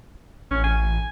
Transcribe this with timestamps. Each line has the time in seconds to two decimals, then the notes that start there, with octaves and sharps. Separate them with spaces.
0.51 A1 C#4
0.64 G#5